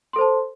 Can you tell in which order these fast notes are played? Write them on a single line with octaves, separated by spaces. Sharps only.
C6 A4 C5 A5